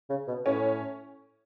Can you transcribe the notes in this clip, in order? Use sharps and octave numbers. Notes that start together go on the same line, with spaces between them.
C#3
B2
A2 C#4